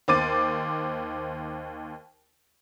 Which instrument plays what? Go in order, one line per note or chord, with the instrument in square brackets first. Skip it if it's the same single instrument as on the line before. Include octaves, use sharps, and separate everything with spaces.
[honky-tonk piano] D#2 C5 D6 A6 D#7